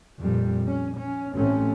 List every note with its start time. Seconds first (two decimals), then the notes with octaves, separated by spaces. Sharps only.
0.21 F2 A#2 G3
0.67 C#4
0.97 C#4
1.34 A1 A3 C4 C#4